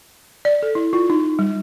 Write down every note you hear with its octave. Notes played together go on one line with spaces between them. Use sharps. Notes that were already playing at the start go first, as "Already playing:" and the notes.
D5
A4
E4
F4
D#4
G3